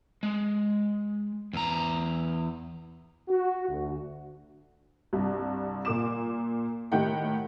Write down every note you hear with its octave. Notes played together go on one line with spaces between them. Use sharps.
G#3
E2 A#5
F#4
D2
C2 G2
A#2 A#3 D6 E7
A2 D#3 G4 F#5 G5